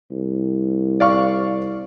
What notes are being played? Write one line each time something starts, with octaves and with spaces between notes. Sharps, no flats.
C2
D5 F5 C#6